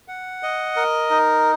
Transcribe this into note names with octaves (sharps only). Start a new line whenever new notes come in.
F#5
D#5
A#4
D#4